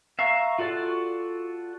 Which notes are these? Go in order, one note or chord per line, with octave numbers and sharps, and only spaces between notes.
E5 F5 A#5 C#6
F4 F#4 A4 D5